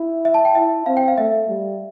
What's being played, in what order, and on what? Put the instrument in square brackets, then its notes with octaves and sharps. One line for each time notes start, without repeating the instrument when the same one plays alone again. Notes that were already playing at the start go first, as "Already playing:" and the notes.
Already playing: [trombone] E4
[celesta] E5
A5
G5
[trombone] E4 [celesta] E5
[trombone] C4 [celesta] F5
[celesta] G5
F5
[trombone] A3 [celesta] E5
[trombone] G3